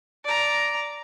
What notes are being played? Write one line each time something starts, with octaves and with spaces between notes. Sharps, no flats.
D5 A#5